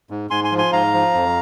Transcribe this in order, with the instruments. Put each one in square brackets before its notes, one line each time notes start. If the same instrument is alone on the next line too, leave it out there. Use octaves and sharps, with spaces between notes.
[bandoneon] G#2
G#2 G#5 C6
G#5 C6
F3
G#5 C6
G#2 F5 A#5
F3
F2